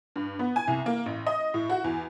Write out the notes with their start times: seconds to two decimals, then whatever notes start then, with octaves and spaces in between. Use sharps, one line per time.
0.16 G2
0.39 B3
0.56 G#5
0.68 C2
0.86 A#3
1.06 A1
1.27 D#5
1.54 A2
1.70 F#4
1.84 E2